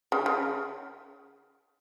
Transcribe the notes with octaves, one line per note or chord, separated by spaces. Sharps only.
C#3
C#3